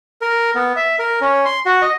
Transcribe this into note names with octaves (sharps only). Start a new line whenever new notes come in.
A#4
B3
E5
A#4
C#4
C6
F#4
D#5